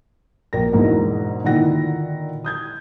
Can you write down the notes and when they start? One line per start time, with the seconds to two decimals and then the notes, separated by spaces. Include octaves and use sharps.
0.53 A#1 A#4 A#6
0.72 E2 G#2 B2 A#3 D4 E4
1.44 A#2 D3 D#3 E4 F#5 A#6
2.44 D#6 G6 G#6